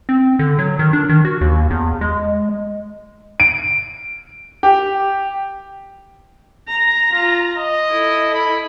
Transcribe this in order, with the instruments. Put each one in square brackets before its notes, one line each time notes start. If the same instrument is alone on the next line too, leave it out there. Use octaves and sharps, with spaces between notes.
[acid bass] C4
D3
F#3
D#3
D4
D#3
F#4
D#2
E2
G#3
[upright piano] D7
G4
[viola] A#5
[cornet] F4
D#5
[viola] E4 A4
[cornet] B5